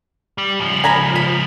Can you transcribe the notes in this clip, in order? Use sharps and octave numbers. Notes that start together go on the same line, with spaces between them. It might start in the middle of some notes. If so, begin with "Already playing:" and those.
G3
C#2 F3
G#5 A#5 B5
B5